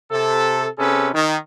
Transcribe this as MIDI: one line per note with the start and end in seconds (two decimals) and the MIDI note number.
0.11 0.68 48
0.11 0.68 69
0.78 1.09 48
0.78 1.09 61
0.78 1.09 68
0.78 1.09 69
0.78 1.09 71
1.13 1.36 51